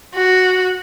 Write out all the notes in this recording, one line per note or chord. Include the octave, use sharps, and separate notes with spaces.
F#4